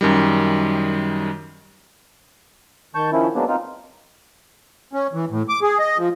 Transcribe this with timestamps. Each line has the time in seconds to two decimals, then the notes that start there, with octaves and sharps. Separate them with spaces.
0.01 F#2 D#3 G3
2.95 D#3 A5 C#6 G6
3.12 D#3 F3 C#4 E4
3.35 F#3 G#3 A#3 B3 D4
3.48 C4 D#4 F4
4.93 C#4
5.13 E3
5.30 A2
5.49 D6
5.62 G#4
5.79 D#5
5.98 F3